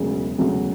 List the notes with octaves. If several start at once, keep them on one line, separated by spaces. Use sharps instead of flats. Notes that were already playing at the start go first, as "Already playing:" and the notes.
Already playing: E1 D2 C#3 F#3
E1 D2 C#3 F#3